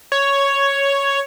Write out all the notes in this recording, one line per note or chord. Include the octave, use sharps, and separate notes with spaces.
C#5